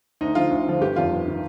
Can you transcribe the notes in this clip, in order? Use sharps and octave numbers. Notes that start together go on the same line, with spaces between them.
D2 D#4
D3 F3 F4
D2
D3 F3
G1 G4
F2 D#3 F4
G1
D#3